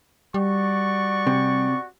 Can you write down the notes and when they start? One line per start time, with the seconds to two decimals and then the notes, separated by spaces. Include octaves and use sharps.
0.34 G3 F#4 D5 C#6
1.27 C3